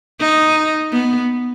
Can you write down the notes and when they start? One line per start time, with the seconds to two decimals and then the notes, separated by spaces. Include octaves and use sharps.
0.20 D#4
0.92 B3